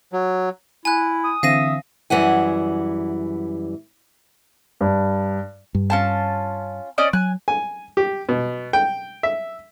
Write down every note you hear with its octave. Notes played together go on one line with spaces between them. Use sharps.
F#3
E4 G#5 F#6
D#6
D3 E3 C4 E5 F5 A#6 D#7
F#2 E3 G3 F#5 G#5
G2
G2
C#4 F4 A5
C#4 D5 D#5
F#3 G#5 F#6
G#5
G4
B2
G5
E5